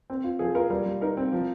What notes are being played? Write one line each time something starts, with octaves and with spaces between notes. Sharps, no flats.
C4
F4
F3 G#4
F4 A#4
G3 A#4
G3
D#4 A#4
C4
F3